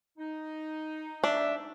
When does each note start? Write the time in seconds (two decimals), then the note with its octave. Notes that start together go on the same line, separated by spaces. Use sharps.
0.18 D#4
1.24 D4 E5